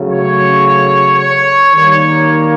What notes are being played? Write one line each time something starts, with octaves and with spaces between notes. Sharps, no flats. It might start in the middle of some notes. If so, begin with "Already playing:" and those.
Already playing: C#3 F#3 A3
C#5
C#5
D#3 G3 A#3 C#5